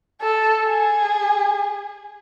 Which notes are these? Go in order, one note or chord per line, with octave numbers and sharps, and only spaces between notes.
A4
G#4